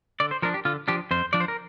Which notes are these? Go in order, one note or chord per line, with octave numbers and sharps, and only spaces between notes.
D3 D5
C5
F3 D4 A#4
G4
D3 F4
F3 D4 G4
F2 C5
F3 D4 D5
C5
A#4